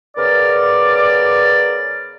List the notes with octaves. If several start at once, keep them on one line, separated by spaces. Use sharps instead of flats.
C#3 B3 A#4 D5